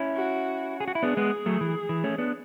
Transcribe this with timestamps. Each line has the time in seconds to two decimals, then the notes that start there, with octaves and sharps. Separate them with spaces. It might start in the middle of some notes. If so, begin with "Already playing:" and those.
Already playing: C#4 E4
0.16 F#4
0.80 G#4
0.88 F#4
0.95 E4
1.03 B3 D4 G#4
1.17 G#3 B3
1.46 F#3 A3
1.61 E3
1.89 E3
2.04 A3 C#4
2.18 B3 D4